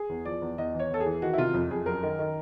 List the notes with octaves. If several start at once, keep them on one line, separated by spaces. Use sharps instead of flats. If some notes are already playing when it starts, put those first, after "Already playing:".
Already playing: G#4
E2
F3 D5
E2
E2 D#5
E3
C#5
E2 A4
G#4
E3
D#3 F#4
E4
C3 F4
F2
F2 G#4
F#2 A#4
D#3
D#3